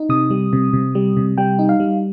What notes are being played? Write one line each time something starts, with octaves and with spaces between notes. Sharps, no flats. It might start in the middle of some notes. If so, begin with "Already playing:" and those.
Already playing: D#4
C3 D#6
G3
C3
C3
G3
C3
G3 G5
D#4
F5
G3